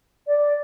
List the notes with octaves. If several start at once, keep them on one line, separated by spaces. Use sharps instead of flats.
D5